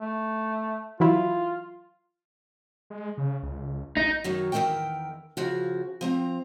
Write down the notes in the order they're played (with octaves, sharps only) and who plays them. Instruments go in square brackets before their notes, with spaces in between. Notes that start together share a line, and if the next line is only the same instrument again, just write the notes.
[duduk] A3
[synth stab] E3 F#3 E4 [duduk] F4
[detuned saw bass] G#3
C#3
C#2
[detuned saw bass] A1 [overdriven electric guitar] D#4
[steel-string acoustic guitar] F#2 D#3 F#3
E2 D#3 G#3 A#4 E5 G5
C#3 F3 F#4
F3 C4 A#5